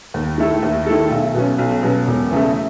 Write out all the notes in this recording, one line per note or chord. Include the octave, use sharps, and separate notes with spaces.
D#2
D#3 A3 E4 A4
D#2
D#3 A3 E4 A4
B1
B2 F#3 C#4
B1
B2 F#3 C#4
E1
E2 C#3 E3 A3